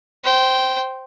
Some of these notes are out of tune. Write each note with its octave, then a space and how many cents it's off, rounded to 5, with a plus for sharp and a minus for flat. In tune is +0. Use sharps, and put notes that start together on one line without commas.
C5 +0 G5 -15